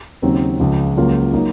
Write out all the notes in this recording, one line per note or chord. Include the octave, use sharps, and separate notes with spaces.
D#2 C#3 F#3 C4 D#4
C#2 C#3 F3
C#2 C#3 F#3 A#3 F4
F#3 A#3 D#4